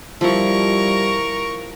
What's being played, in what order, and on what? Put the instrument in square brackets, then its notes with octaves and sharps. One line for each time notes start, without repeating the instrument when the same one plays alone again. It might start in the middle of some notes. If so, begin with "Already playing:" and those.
[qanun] F3 E4 [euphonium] G3 [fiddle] A#4 C#6